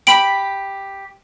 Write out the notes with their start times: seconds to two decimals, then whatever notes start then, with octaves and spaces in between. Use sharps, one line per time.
0.07 G4 B5 D7 F#7